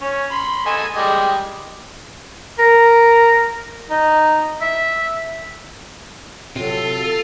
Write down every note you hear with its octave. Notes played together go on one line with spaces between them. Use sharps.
C#4
B5 C6
A4 D#5 G#5
G3 G#3 D#5
A#4
D#4
E5
C3 F#3 F4 A4